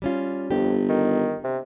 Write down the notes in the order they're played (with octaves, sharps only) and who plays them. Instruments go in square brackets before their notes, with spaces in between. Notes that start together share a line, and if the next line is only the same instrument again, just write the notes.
[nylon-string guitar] G3 C#4 F4
[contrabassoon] G1 [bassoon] F2 [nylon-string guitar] G4
[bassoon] D#3
C3